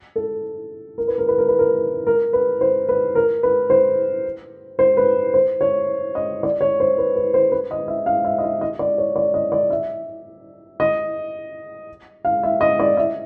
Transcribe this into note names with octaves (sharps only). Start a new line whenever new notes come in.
A4
A#4
B4
A#4
B4
A#4
B4
A#4
A#4
B4
C5
B4
A#4
B4
C5
C5
B4
C5
C#5
D#5
D5
C#5
C5
B4
B4
C5
B4
D#5
E5
F5
E5
D#5
E5
D#5
D5
C#5
D5
D#5
D5
E5
D#5
F5
E5
D#5
D5
E5